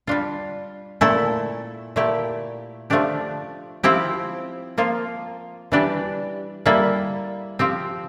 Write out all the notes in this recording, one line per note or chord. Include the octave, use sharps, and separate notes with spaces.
G3 D4 F4
A#2 A3 E4 A4
A#2 A3 E4 G4
F3 A3 D4 G4
F3 C4 E4 G4
F3 A#3 F4
E3 G3 D4 G4
G3 A#3 E4 A4
F3 C4 G4